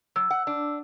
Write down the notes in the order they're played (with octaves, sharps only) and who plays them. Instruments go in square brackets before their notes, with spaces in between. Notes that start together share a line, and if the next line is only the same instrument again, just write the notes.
[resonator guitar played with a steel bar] F#3 [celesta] E6
[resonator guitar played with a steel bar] F#5
D4